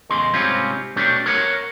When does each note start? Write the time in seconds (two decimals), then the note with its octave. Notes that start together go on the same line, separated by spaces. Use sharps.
0.10 E2 A2 C#3 D#5 C6
0.33 G#2 C3 G3 C4 C#4 F4
0.96 B2 A3 C#4 D4 F#4 G4
1.26 A#4 C#5 F#5